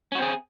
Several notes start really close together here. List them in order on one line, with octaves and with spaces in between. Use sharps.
C#4 F#4 C4 G#4